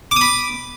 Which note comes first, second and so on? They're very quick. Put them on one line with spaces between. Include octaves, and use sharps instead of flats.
D6 D#6 B5